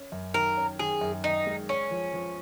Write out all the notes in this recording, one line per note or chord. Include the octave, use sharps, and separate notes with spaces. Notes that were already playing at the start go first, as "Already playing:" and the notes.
Already playing: C#4
F#2
D#3 A#4
C#4
D#3 G#4
F#2
D#3 D#4
G#3
C#4 C#5
F3
F3